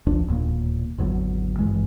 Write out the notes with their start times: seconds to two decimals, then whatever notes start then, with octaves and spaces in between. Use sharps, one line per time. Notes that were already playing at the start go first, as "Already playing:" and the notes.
0.06 A1 D2 F3 D4
0.28 E1 D#2 A#2 A#3
0.98 G#1 E2 D3 F#3
1.59 G#1 G2 E3 G#3